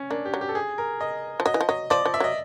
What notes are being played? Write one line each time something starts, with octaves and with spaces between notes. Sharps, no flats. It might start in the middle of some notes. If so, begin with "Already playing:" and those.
Already playing: C#4
A#3 D4
G4
F#3
G4
A4
G#4
A#4
D#5
F3
F#3 D#5
E3
F3
F#3 D#5
F3 D5
F3
E5
F#3 D#5